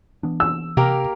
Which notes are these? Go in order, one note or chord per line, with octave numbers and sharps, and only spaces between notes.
E3 B3 D4
E6
C3 A#3 G4 A#4